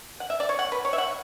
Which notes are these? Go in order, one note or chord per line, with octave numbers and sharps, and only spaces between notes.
F#5
E5
D5
C#5
F#5
B4
C#5
E5
F#5